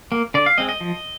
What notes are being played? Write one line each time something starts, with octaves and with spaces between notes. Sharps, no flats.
A#3
D3 D5
F5
G#3 C4 D#5
D#5
F3